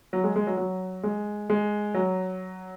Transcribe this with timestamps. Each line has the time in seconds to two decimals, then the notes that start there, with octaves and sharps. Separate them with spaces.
0.13 F#3
0.24 G#3
0.36 G#3
0.47 F#3
0.57 F#3
1.03 G#3
1.50 G#3
1.94 F#3